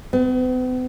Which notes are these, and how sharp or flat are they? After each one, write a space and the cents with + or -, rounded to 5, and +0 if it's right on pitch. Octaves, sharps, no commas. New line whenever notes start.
B3 +45